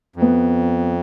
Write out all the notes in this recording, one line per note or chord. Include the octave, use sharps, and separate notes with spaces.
F2
B3